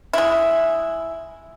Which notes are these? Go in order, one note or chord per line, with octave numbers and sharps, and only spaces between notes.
G#3 E4